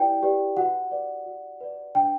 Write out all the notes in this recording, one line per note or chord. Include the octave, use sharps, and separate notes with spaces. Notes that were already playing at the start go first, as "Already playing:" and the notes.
Already playing: E4 G4 B4 D5 G5
G4 B4 D5
F#4 F#5
B4 D5
F#4
B4 D5
D4 G5